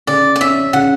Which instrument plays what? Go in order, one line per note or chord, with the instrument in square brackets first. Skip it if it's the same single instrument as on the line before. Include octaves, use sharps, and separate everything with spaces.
[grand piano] C#3 [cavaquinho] D5
[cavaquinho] D5
[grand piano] C#4 [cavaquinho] E5
[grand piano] C#3 [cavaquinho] F#5